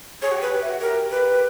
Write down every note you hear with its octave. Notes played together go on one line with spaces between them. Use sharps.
G#4 C#5
F#4
G4
B4
G4
E5
F#4
G4 A#4
B4